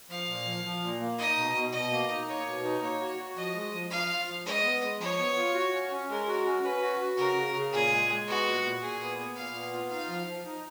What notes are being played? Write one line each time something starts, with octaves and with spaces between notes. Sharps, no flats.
F3 F5
A#2
F3
F3
A#2
A#3
D#4 D#5
B2
B2
B2 D#5
A#3
D#4
A#3 C#5
B2
D#4
A#3 C#5
F#4
F#4
F3 D#5
G#3
F3
F3 F5
F4
F3
G#3 D#5
B3
G#3
F3 C#5
B3
F4
F#4
C#4
C#4
G#3 A#4
F#4
C#4
C#4 B4
F#4
F#4
C#3 A#4
C#3
C#3
A#2 G#4
G#3
G#3
B3 F#4
A#2
A#2
A#2 G#4
B3
B3
A#2 F5
B3
F4
D#4 F5
F3
F3
D#4